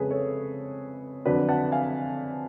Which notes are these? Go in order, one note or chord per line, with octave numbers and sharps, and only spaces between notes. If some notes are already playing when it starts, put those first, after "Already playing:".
Already playing: F2 C#3 G#3 G#4 A4 B4 C#5
A4 C#5
F2 D3 F#3 B4 D5
F#5 A5
F5 G#5